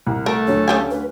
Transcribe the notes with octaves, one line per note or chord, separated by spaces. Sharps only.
C2
A3 A#4
D2 D3 F#3 C#5
C#3 G4 G#5
B4